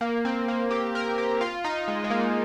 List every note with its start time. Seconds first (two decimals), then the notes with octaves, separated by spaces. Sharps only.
0.01 A#3
0.25 C4
0.48 A#3
0.71 G4
0.95 A#4
1.18 G4
1.41 F4
1.64 D#4
1.88 G#3
2.04 G#3
2.10 A#3